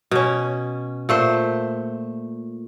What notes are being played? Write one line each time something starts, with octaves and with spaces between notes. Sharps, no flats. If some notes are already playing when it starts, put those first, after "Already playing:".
B2 C#4
A#2 A3 C5